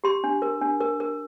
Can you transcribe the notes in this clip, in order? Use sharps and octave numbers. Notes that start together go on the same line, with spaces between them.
G4 C6
D4
A#4
D4
A#4
A#4